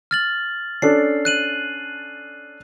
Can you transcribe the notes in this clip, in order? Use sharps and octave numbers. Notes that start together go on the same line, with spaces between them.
F6 A6 F#7
C#4 D4 A4 C7
F#6 D#7 F#7